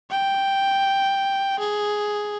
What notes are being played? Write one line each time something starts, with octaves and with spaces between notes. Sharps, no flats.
G5
G#4